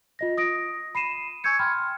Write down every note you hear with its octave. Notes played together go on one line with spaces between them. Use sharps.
F4 D#5 A#6
D#6 A#6 D7
B5 C7 D#7 E7
G#5 C#6 E6 G6 G#6 C#7
G5 B5 C6 F6